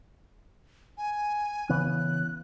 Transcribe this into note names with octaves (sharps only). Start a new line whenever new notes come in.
G#5
C#3 E3 B3 F#6